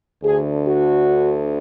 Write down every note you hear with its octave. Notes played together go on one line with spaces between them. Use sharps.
D2 D3 G#4
F#4